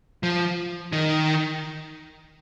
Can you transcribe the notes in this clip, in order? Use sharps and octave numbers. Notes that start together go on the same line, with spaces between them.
F3
D#3